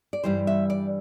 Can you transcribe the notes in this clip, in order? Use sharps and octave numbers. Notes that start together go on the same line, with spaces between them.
D5
G2 E3 G3 C5
E5
D5